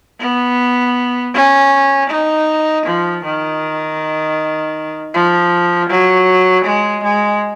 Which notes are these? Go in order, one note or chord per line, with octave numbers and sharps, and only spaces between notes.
B3
C#4
D#4
F3
D#3
F3
F#3
G#3
G#3